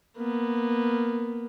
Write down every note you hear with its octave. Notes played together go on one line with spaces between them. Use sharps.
A#3 B3